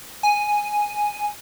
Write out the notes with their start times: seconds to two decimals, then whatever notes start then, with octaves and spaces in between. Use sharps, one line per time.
0.23 G#5